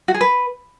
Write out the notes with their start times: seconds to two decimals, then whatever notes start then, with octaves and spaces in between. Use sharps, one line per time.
0.08 F#4
0.14 G#4
0.21 B4